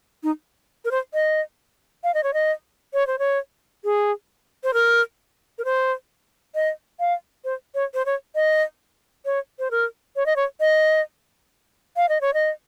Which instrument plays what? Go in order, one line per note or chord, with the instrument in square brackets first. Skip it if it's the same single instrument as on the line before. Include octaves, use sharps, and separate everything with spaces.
[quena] D#4
A#4
C5
D#5
F5
D#5
C#5
D#5
C#5
C5
C#5
G#4
C5
A#4
A#4
C5
D#5
F5
C5
C#5
C5
C#5
D#5
C#5
C5
A#4
C#5
D#5
C#5
D#5
F5
D#5
C#5
D#5